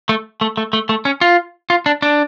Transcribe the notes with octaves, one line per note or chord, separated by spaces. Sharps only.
A3
A3
A3
A3
A3
C#4
F4
F4
D4
D4